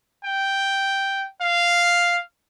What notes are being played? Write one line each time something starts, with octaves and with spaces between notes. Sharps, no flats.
G5
F5